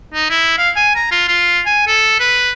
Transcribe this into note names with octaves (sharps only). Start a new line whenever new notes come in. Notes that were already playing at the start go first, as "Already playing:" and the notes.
D#4
E4
F5
G#5
A#5
F4
F4
G#5
A4
B4